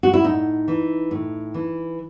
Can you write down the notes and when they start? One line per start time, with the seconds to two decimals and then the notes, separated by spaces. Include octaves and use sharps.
0.03 F#4
0.13 E4
0.24 A2 D#4
0.68 E3
1.11 A2
1.54 E3